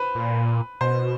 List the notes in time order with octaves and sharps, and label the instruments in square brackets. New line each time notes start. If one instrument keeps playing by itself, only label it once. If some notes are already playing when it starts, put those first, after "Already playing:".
Already playing: [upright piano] B4 C5
[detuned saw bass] A#2
[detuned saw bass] B2 [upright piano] C5